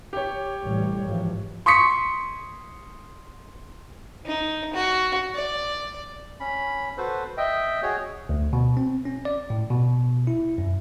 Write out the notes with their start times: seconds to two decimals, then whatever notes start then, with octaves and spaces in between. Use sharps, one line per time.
0.13 G4 C#5
0.60 A1 C3 G3
1.04 G#1 E3 F3
1.66 C6 C#6 D#6 B6 C#7
4.26 D#4
4.73 F#4
5.34 D5
6.40 C#4 B5
6.98 F#4 A4 B4 C5
7.37 D#5 E5 G5
7.83 F#4 G#4 C#5
8.29 D2
8.53 B2
8.77 C4
9.05 C#4
9.25 D5
9.50 A2
9.70 B2
10.27 E4
10.58 F#2